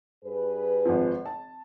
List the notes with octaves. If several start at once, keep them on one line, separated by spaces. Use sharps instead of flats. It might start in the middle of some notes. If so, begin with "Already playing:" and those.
G2 G#4 B4
G#1 F3
A5